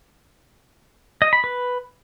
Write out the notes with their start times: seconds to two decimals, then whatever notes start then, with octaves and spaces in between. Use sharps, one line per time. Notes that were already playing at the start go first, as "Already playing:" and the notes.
1.22 D#5
1.33 B5
1.44 B4